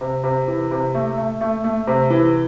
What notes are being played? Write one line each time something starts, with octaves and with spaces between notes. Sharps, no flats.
C3
C3
E3
C3
A3
A3
A3
A3
C3
E3